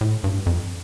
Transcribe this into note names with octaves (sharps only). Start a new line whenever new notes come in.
A2
G2
F2